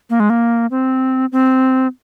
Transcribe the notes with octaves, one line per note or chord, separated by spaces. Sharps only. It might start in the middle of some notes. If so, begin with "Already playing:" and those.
A#3
G#3
A#3
C4
C4